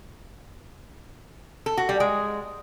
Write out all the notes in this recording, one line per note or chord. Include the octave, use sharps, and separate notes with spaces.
A4
F#4
G3
G#3